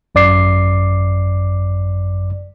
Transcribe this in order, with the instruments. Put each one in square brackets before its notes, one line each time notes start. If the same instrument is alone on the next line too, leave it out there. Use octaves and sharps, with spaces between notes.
[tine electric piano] G#1 F#2 D5 D6 C7